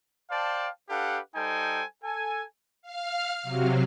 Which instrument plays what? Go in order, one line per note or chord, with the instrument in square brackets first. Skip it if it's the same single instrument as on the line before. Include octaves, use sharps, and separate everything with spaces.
[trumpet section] C5 D5 F5 G5 A5
D4 G4 A4 B4 F5 F#5
G3 D#4 A4 C5 G5 G#5
A4 G#5
[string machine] F5 F6
C3 F#3